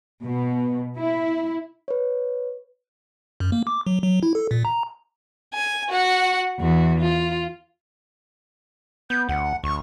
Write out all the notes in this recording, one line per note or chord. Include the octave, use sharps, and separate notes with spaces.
B2
E4
B4 C#5
F#2
A#3
D6
F#3
F#3
E4
A4
A#2
A#5
G#5
F#4 F#5
E2 F#4
F4
B3 G6
D2 F#5
D2 C#6